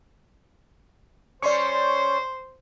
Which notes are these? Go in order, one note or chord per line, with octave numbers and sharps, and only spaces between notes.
G3 C#4 C5 D5 C6 C#6